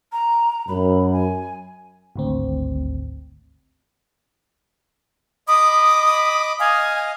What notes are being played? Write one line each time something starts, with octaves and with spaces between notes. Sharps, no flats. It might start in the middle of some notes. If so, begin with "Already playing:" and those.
A#5
F#2 B5
G#5
G#1 D2 C4
D#5 B5 D6 D#6
D#5 F5 G#5